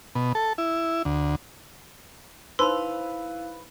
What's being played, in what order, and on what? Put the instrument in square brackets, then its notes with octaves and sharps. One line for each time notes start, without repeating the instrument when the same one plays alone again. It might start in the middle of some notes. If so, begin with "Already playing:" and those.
[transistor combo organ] B2
A4
E4
D2
[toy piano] D#4 C5 E6 [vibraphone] E4 F5 [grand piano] B4 [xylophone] C6